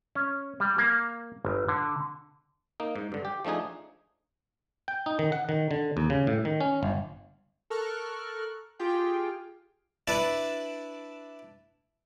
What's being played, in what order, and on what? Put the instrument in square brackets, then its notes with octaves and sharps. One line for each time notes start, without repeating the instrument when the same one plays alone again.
[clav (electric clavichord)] C#4
G3
A#3
G1
D3
A#3 D#4
G#2
G2 D3
G4
F3 A3 D4 D#4 G#4
G5
D#4
D#3
F#5
D#3
D3
D#2
C#3
A2
D#3
C#4
G1
[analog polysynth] A4 A#4 C#6 F6 F#6
F4 G4 G#4 G5
[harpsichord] D4 E4 B4 D5 A5